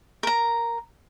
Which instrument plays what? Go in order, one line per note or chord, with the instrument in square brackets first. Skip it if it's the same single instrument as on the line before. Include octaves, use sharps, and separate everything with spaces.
[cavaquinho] A#4 A#5